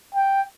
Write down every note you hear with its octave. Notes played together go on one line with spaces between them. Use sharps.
G5